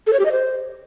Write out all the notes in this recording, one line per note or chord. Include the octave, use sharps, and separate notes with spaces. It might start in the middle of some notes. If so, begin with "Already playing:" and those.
A4
C#5
G4
D#5
C5